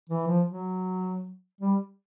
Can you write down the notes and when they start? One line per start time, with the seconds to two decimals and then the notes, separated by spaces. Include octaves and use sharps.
0.10 E3
0.27 F3
0.46 F#3
1.61 G3